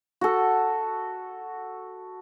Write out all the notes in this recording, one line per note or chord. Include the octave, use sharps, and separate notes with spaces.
F#4 A4